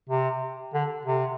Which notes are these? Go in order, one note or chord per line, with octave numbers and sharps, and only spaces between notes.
C3
D3
C3